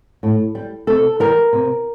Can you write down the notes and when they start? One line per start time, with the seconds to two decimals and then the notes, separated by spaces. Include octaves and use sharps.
0.23 A2
0.55 G3
0.87 C3 A4
1.20 E3 G3 A#4
1.53 C3